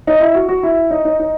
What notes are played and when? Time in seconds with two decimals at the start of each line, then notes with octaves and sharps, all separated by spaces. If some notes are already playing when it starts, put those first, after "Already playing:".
0.07 D#4
0.20 E4
0.34 F#4
0.49 F#4
0.63 E4
0.91 D#4
1.05 D#4
1.20 D#4